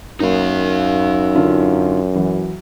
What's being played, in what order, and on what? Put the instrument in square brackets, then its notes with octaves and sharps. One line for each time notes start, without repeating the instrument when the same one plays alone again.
[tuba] F#2 [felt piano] A#3 [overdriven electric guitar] D#4 F5
[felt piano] D3 D4 F4
E3 F#3